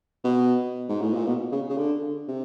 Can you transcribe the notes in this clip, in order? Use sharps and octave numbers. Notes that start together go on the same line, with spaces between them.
B2
G#2
A2
A#2
B2
C#3
C#3
D3
C3